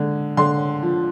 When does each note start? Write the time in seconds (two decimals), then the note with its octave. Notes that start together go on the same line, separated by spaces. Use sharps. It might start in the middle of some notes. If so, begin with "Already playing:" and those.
Already playing: D3 G#3
0.37 D3 C6
0.82 F3